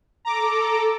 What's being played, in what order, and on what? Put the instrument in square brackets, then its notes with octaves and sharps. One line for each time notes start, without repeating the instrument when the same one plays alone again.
[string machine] A4 [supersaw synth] A#5 D6